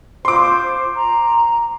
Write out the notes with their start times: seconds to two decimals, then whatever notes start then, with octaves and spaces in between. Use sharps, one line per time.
0.25 F4 C5 C6 D6
0.96 A#5